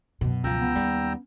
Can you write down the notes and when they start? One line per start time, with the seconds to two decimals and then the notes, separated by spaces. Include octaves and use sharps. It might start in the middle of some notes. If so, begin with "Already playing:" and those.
0.21 F#2 B2
0.44 C#2 F3 G5 A#5 E6
0.60 B3
0.76 D#2 G3 C#4